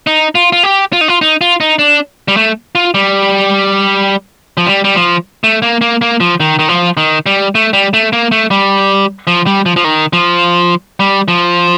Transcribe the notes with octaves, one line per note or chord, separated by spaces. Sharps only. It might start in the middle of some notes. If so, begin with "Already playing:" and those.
D#4
F4
F4
G4
F4
D#4
F4
D#4
F4
D#4
D4
G3
A3
F4
G3
F3
G3
G3
F3
A3
A#3
A#3
A#3
F3
D#3
D#3
F3
D#3
G3
A3
G3
A3
A#3
A3
G3
F3
G3
F3
F3
D#3
F3
G3
F3